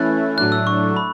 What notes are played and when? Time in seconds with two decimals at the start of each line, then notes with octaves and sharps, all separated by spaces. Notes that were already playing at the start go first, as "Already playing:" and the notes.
Already playing: E3 A3 C#4 E4 F#6 A6
0.37 A2 F#3 A3 D4 F#6
0.52 E6
0.67 C#6
0.97 B5